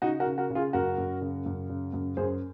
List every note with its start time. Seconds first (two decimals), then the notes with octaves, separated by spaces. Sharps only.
0.02 C#3 D#4 F#4
0.20 F#4 A#4
0.26 C#3
0.38 F#4 A#4
0.50 C#3
0.55 F4 G#4
0.73 F#2 F#4 A#4
0.98 F#2
1.21 C#3
1.46 F#2
1.69 C#3
1.93 F#2
2.17 F#2 G#4 C5